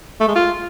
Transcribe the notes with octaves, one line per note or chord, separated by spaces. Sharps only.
A3
G#3
F4